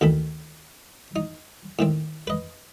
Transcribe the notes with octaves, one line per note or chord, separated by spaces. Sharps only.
D2 D#3 A4 B5
D#4
A2 D#3 C4
B4 D#5